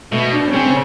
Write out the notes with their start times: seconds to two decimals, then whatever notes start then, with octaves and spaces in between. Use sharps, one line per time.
0.12 B2 A3
0.32 D4
0.48 C#4
0.53 C#3 C4
0.66 C#4